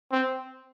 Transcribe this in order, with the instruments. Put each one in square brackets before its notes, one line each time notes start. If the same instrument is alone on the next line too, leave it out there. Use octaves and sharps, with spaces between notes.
[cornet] C4